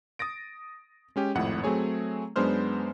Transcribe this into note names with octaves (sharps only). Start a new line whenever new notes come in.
D#6 A6 A#6 D7
G#3 C#4 G4
G#1 F2 A2 F#5
F#3 A3 C4 G#4 C#5
F#2 G#3 B3 D4 C5 F6